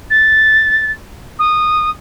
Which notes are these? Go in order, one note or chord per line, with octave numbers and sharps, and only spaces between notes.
A6
D#6